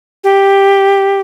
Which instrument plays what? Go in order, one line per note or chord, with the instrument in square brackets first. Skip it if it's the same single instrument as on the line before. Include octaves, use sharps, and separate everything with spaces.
[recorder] G4